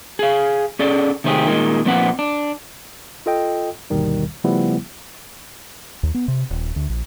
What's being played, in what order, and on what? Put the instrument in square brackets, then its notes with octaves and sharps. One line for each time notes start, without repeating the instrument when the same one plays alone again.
[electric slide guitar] G#4 F5
C#4 G#4 A4 D5
C3 D#3 A3 C4 G4 G#4
A#2 D#3 G#3
A#2 F3 C4 B4 F#5
D4
[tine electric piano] F4 A4 D#5 G5
G1 D#2 B2 D#3 G3
C#3 F3 G3 A3 B3 E4
[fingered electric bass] D#2
B3
C3
D#1
D2
A#1